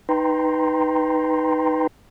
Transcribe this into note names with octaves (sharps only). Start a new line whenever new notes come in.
D#4 B4 G5 A#5 C6